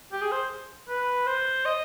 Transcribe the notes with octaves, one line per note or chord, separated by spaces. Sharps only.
G4
G#4
C5
B4
C5
D#5